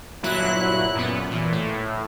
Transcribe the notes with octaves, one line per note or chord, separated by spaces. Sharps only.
G1 A#2 F#3 E4 F#6
F#2 A#2 B3
A#2 E3
A2